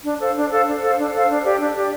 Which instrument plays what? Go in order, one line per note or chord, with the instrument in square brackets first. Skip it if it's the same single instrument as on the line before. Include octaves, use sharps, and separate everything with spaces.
[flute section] D4
A4 C5 F5
D4
A4 C5 F5
D4
A4 C5 F5
D4
A4 C5 F5
D4
G4 D5
D4
G4 D5